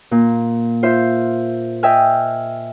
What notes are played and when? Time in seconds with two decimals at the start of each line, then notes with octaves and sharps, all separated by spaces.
0.11 A#2
0.83 F4 C5 E5
1.83 D#5 E5 G5 G#5 E6 F6